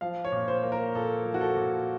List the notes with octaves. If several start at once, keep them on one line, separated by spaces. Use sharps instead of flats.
F3 F5
C#5
A#2
C5
A#3
A#4
A#2 A4
F3
F#4
A4
A#2